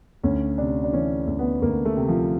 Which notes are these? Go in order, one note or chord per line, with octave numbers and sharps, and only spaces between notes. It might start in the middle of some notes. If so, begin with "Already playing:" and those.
D2 C#4
C3 D4
D4
E3 C#4
D2
B3
D2 A#3
A3
C3
F3